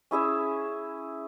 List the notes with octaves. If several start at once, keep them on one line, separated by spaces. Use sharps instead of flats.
C#4 E4 G#4 E5